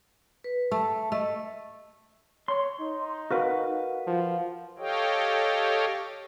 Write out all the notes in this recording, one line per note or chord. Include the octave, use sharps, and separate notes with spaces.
B4
A3 A5
A3 D#5
C#5 C6
D#4
F#4 A#4 B4 F5 F#5
F3
G4 A4 C#5 D#5 F5 G5